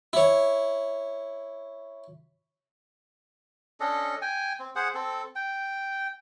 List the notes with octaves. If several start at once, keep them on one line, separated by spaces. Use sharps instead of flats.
E4 C#5
C#4 D4 A4 D#5
G5 G#5
C4
G#4 C5 F#5
C4 A4
G5